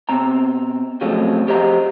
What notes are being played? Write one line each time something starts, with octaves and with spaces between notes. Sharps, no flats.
B2 C4 A#5
C#3 F3 F#3 G#3 A3 C4
F3 G4 C5 D#5 A#5